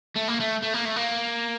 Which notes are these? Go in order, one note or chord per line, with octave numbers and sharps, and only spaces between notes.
A3
A#3
A3
A3
A#3
A3
A#3